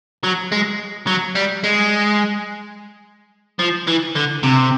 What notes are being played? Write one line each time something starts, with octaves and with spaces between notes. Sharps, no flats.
F#3
G#3
F#3
G3
G#3
F3
E3
D3
C3